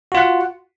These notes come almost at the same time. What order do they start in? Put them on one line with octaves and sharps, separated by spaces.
F#4 F4 F#5